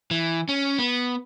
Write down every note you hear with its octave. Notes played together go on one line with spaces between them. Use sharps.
E3
C#4
B3